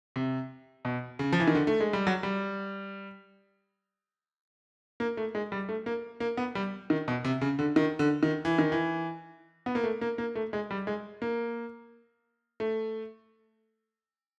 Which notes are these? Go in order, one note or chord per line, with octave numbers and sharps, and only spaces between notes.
C3
B2
C#3
F3
E3
D#3
D3
A3
G#3
G3
F#3
G3
A#3
A3
G#3
G3
A3
A#3
A#3
B3
G3
D#3
B2
C3
C#3
D3
D#3
D3
D#3
E3
D#3
E3
B3
A#3
A3
A#3
A#3
A3
G#3
G3
G#3
A#3
A3